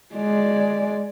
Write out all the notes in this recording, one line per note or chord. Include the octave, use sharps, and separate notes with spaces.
G#3 D5